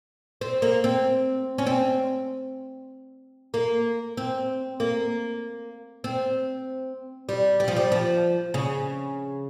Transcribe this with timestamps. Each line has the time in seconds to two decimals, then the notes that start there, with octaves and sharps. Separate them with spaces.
0.41 C4
0.62 A#3
0.84 C4
1.58 C#4
1.67 C4
3.54 A#3
4.17 C4
4.80 A#3
6.04 C4
7.29 G3
7.60 G3
7.68 F3
7.76 G3
7.92 F3
8.54 C#3